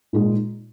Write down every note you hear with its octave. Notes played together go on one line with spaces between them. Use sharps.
A#2 G#3 D#4